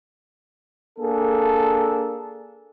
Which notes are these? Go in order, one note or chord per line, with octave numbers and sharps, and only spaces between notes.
A#3 D4 G#4 A4